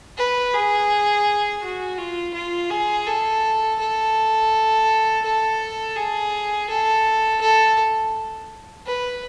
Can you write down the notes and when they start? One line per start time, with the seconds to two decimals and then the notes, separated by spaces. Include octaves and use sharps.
0.17 B4
0.53 G#4
1.62 F#4
1.98 F4
2.34 F4
2.71 G#4
3.07 A4
3.79 A4
5.24 A4
5.96 G#4
6.69 A4
7.41 A4
8.86 B4